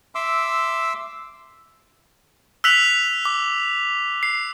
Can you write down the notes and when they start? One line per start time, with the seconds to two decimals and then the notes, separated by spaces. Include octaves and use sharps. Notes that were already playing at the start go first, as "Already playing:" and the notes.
0.15 E5 C6 D6 E6
2.64 E6 F#6 B6 F7 F#7
3.25 D6
4.23 C7